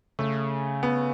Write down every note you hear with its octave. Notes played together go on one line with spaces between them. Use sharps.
C#3 A3
B3